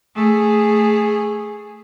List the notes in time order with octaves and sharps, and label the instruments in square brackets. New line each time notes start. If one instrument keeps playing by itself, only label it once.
[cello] A3 G#4